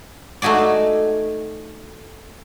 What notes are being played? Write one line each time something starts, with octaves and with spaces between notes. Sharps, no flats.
A3 D#4 F#4 G#4 D5